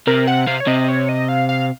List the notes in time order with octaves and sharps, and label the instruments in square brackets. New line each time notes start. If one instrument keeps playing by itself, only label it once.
[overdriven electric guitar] C3 [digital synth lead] A#4
[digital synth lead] F#5
[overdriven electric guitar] C3 [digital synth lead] F5
[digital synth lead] C#5
[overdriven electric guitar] C3 [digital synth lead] D#5
[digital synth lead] C#5
D#5
F5
F5